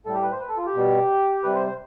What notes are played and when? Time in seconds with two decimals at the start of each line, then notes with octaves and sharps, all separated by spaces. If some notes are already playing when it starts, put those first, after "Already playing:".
0.06 A2 G3 A4
0.14 G4
0.23 B4
0.32 C5
0.40 B4
0.49 A4
0.57 F4
0.66 G4
0.75 B2 G3
1.43 C3 G3 B4
1.55 C5
1.67 C5